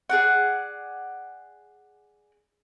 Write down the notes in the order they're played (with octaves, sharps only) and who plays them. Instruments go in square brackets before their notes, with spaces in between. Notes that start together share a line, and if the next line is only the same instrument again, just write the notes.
[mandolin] G#4 D5 F#5